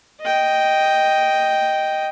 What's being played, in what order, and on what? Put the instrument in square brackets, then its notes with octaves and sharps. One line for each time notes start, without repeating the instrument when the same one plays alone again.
[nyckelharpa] D#5 G5